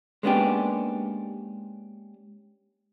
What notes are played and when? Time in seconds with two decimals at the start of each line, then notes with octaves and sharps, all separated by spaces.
0.23 G#3 A#3 B3 C#4 D4 G4